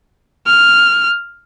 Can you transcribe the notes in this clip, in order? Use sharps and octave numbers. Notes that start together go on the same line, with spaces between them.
F6